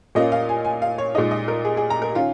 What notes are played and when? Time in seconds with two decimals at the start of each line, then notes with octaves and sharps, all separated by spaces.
0.15 A#2 A#3 C#4 F4 D#5
0.32 F5
0.49 G#5
0.65 G#5
0.82 F5
0.98 C#5
1.14 A#2 G#3 D#4 D#5
1.31 D#5
1.48 A#4
1.65 G#4
1.77 G#4
1.90 A#5
2.02 A#4
2.15 D#3 C#4 F4